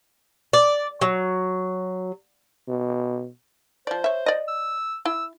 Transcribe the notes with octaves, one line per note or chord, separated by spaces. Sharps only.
D5
F#3
B2
F3 C5 D5
C#5 E5
D5 D#5
E6
E4 E6